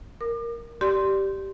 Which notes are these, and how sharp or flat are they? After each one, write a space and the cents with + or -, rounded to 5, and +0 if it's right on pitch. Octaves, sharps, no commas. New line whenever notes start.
A#4 +0 D6 +40
G4 -10 D5 +0 C6 +0